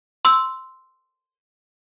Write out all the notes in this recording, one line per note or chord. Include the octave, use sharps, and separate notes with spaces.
C6 E6